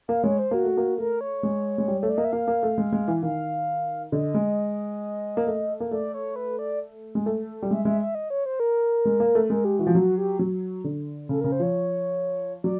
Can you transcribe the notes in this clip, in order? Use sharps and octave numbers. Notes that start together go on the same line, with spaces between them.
A#3 F5
G#3 C#5
C5
A#3 F#4
A3
A#3
A3 A#4
C#5
G#3
G#3
G3
A3 C#5
D5
A#3 D#5
E5
A#3 F5
A#3
A3
G#3
G#3
E3
D#3 F5
D3 D#5
G#3
A#3
A3
A#3
A3 D5
C#5
B4
D5
G#3
A3
G3
G#3 E5
G#3 E5
E5
D#5
C#5
C5
A#4
G#3
A#3
A3
G#3 A#4
G4
E3 F#4
F3
F#3 F#4
G4
F#3
D3
C#3 A4
C#3 A#4
C5
F3 C#5
F#3 D5